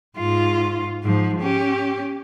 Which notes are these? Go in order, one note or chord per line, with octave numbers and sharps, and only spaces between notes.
G#2 F4
G#2 F3
C#4 G4